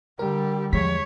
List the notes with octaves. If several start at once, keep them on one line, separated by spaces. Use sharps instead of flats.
D3 G3 G4 A#4
E2 F3 G#3 C#5 B6